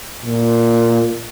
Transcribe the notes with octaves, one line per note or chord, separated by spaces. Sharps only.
A#2